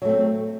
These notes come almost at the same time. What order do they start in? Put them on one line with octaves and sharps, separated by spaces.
F#3 A3 C4